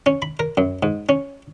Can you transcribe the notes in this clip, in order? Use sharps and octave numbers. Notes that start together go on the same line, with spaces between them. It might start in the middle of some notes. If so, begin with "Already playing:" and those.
C#4
B5
A#4
F#2
G#2
C#4